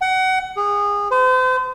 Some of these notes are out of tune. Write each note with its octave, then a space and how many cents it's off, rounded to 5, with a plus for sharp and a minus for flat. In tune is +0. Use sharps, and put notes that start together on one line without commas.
F#5 +25
G#4 -25
C5 -40